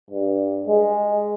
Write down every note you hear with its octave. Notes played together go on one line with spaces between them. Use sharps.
G2
G#3